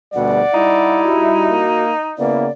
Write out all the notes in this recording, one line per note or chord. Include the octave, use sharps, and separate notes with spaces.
D2 B2 G3 D5 F#5
G3 D#4 E4
F#4
A#3
C#3 A#3 B3 E4 D5